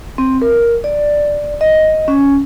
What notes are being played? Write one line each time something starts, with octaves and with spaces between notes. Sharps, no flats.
C4
A#4
D5
D#5
C#4